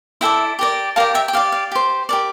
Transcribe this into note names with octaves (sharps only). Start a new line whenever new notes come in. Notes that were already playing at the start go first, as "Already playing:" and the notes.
E4 A4 D5 E5 G5
G4 A#4 D5
G4 A#4 D5 F5 A5
E5 G5
G5
G4 D5 F5
F5
G4 C5
G4 A#4 D5